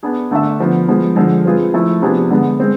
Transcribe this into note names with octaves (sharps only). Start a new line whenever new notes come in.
B3 D4 G#4
D3 A3 D4 A4 E5
D3 F3 B3
F3 G#3 B3
D3 F3 G#3 D4 A4
G#3 C4 F4 G#4 B4
F3 A3 E4 A4
C3 F3 B3 D4 G#4
D3 G#3 B3
G#3 C4